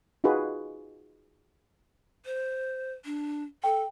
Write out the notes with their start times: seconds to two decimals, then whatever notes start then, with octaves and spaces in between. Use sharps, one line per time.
0.24 D#4 F4 F#4 G#4 B4
2.26 C5
3.05 D4
3.64 A4 G5